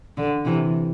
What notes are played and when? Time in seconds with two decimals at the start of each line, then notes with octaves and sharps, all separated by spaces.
0.18 D3
0.45 C3 E3